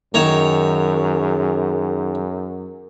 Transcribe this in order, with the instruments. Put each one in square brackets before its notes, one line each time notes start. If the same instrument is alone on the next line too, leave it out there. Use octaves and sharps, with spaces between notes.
[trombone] F#2 [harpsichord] D#3 C#5 A#5 [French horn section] G#4 [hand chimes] A#4